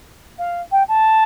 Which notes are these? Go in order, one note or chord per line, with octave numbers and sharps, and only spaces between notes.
F5
G5
A5